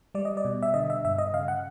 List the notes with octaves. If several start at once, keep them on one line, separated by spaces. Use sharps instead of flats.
G3 D5
D#5
D5
B2
E5
D3 D#5
E5
G2 E5
D#5
C#3 F5
F#5